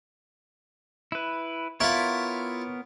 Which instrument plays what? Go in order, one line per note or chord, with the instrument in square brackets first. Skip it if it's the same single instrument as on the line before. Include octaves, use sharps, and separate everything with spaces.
[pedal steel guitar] E4 B4
[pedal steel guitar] B3 A#4 C#5 [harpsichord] E4 F4